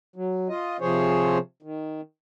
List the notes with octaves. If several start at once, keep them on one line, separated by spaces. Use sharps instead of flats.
F#3
F4 D#5
C3 F3 G#4 C5 C#5
D#3